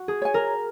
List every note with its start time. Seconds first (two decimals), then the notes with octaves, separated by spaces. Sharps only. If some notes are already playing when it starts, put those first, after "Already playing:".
Already playing: F#4
0.08 G#4
0.22 C#5 G#5
0.34 A#4